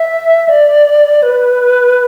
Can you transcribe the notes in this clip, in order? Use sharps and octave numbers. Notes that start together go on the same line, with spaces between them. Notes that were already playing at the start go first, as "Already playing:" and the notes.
Already playing: E5
D5
B4